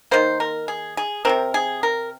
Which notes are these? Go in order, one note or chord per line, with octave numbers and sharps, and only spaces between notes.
D#3 A#3 C5
A#4
G#4
G#4
C3 F3 C4 A#4
G#4
A#4